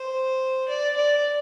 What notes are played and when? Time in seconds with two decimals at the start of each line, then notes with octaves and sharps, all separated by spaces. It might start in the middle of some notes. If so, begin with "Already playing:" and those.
Already playing: C5
0.68 D5
0.96 D5